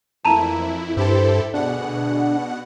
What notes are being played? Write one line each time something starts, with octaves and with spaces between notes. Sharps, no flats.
F2 E3 A3 A#3 E4 A5 A#5 D#7
G2 E4 G4 A4 C5
D2 B2 D4 G#4 F#5